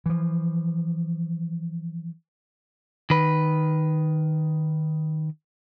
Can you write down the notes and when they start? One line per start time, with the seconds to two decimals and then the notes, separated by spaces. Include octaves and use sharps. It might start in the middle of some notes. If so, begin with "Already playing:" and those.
0.06 E3 F3
3.10 D#3 B4